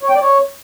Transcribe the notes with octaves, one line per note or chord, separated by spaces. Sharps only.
C#5
G5
D5
C#5